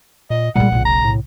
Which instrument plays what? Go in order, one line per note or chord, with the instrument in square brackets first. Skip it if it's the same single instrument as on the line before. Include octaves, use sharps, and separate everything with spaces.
[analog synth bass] A#2 [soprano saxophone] D#5
[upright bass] A#2 G#3 [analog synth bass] G3 [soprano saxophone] F#5
[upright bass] B1 C#3 [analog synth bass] A#2
[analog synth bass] E1 [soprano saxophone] A#5
[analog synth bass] A2